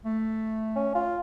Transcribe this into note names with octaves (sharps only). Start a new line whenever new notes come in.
A3
C#4
F4